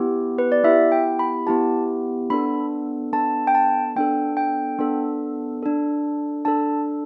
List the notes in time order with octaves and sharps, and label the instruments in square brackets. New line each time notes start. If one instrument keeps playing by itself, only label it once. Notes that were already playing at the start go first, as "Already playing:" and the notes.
Already playing: [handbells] B3 E4 G4
B4
D5
B3 E4 G4 E5
G5
B5
B3 E4 G4 A5
B3 D4 A4 B5
B3 D4 A4 A5
G5
A5
B3 D4 A4 G5
G5
B3 D4 A4
D4 A4
D4 A4 A5